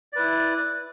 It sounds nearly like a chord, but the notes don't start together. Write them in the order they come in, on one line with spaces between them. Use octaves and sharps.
D5 B4 E4